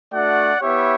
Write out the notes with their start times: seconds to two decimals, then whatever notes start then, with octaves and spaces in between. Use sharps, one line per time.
0.13 A3 D4 F#4 D5 F#5
0.62 B3 E4 G4 C#5 E5